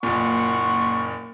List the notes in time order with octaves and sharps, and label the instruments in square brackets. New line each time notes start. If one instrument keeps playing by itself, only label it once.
[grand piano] F#1 A#2 [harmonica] F#5 C6 C#6